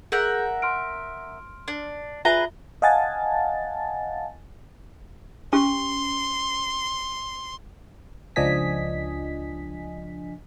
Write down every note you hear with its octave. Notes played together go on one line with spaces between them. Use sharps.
G#4 A#4 E5 F#5 G6
C6 F6 D7
D4
F4 G#4 B4 E5 A#5 G7
D#5 F5 F#5 G#5 A5 A6
C#4 G4 C6
C#2 F3 D4 D#5 G#5 B6